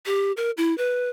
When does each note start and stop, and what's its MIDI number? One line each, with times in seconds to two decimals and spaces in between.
0.06 0.32 67
0.37 0.51 70
0.57 0.76 64
0.78 1.09 71